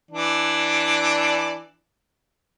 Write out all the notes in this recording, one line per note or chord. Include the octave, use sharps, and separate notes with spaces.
E3 D4 D5